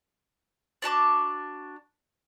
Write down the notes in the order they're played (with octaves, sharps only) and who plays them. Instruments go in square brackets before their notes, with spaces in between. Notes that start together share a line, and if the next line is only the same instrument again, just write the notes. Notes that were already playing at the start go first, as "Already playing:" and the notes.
[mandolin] D4 F#4 A5 D6